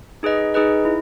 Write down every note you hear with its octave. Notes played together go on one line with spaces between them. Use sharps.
D#4 G#4 B4 D#5
D#4 G#4 B4 D#5
E4